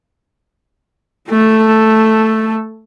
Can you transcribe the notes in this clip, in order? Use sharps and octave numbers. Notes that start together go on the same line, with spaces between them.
A3 A4